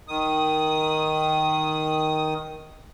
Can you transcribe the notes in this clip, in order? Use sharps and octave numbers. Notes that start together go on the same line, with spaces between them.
D#3 D#6